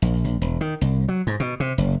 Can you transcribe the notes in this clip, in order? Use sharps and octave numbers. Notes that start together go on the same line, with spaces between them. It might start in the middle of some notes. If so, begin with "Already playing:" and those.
A#1
A#1
E1
D#3
C2
F#3
G#2
B2
C3
F#1